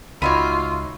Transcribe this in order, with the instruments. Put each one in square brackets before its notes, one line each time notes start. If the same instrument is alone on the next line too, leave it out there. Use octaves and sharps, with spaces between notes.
[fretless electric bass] C#2 [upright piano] D#4 F#4 D#7 [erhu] F4 [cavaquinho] C#5 E5 B5